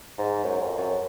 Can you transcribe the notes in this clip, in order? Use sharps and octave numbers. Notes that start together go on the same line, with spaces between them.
G#2
F#2
F2
F#2